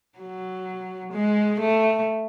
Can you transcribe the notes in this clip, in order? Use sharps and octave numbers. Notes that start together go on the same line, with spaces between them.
F#3
G#3
A3